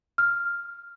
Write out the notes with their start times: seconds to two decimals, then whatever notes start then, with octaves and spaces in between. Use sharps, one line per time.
0.18 F6